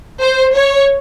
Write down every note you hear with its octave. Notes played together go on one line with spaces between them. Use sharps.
C5
C#5